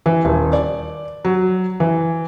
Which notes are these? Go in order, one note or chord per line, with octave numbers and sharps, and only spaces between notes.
E3
D#1
D5
F#3
E3